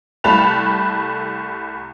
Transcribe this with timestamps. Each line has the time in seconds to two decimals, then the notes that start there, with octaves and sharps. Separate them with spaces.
0.24 C2 A3 A5 B5 F#6 F7